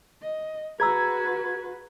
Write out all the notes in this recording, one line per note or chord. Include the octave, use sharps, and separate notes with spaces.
D#5
F#4 G#4 B4 A#5 E6 G#6